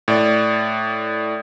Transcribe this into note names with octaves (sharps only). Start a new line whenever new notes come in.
A2 D5